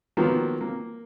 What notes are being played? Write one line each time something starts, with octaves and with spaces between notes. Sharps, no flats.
D#3 F3 F#3 A#3 B3
A#3